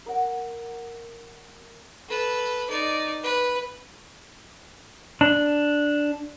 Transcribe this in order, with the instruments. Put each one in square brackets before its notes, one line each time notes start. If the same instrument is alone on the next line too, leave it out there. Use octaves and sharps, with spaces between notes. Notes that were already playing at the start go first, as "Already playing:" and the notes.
[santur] A#4 F#5
[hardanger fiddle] A4 B4
D#4 D5
B4
[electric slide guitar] D4